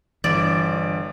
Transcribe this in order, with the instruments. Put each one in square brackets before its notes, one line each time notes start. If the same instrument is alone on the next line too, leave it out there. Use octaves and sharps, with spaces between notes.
[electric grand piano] G1 D3 D7 [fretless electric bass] E3 [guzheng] D5